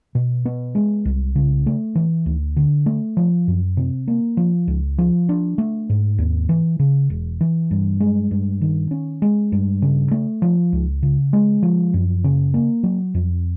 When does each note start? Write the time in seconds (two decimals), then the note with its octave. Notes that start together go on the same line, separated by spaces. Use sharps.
0.15 B2
0.45 B3
0.75 G#3
1.05 C2
1.36 C#3
1.66 A3
1.95 E3
2.26 D2
2.56 D3
2.86 A3
3.17 F3
3.48 F#2
3.77 C3
4.08 A#3
4.37 F3
4.67 C#2
4.98 F3
5.29 D4
5.58 A3
5.89 G#2
6.18 D#2
6.49 E3
6.79 C#3
7.10 E1
7.41 E3
7.71 G2
8.00 G#3
8.31 G2
8.61 D#3
8.91 C#4
9.22 G#3
9.52 G2
9.82 C#3
10.11 A3
10.42 F3
10.73 C#2
11.03 C#3
11.33 G#3
11.63 F3
11.94 F#2
12.24 C#3
12.54 A#3
12.83 F#3
13.14 F2